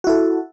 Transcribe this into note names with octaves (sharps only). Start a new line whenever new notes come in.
E4 F#4 A4